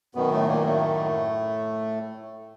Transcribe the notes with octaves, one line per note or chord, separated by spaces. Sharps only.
F#2 B2 D#3 B3
A2 A3
A#2 A#3
A2 A3